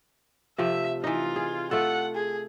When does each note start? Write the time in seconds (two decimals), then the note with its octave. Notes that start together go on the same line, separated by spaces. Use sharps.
0.58 C3 F3 A3 E5
1.04 E3 D#4 F4
1.36 G#4
1.71 A3 F4 A4 F#5
2.15 G#4